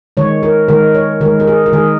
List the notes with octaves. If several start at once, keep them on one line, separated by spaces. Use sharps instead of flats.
D#3 G#3 C#5
A#4
D#3 G#3 A#4
C#5
D#3 G#3 A#4
A#4
G#4
A#4
D#3 G#3 G#4